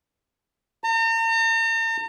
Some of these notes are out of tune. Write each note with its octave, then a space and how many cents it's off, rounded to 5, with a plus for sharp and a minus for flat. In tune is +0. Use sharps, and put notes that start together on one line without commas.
A#5 -45